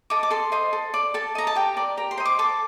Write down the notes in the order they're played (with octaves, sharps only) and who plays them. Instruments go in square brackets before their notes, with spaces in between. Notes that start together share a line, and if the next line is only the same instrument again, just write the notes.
[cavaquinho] A4 D#5 D6
D6
A4 C6
C5 D#5
A4
D5
A4 A5
D#5 A#5
A5
G4 G5
A#4 D5
G4 A#5
C6
C5 D#5
D6
A4 D6